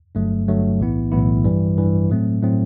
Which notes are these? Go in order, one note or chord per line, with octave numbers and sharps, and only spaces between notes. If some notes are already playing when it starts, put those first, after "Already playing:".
G1 G2 F#3 A3
G1 G2 F#3 A3
B1 A2 E3 B3 E4
B1 A2 E3 B3 E4
G2 E3 G3
G2 E3 G3
A2 F#3 A3 C4
A2 F#3 A3 C4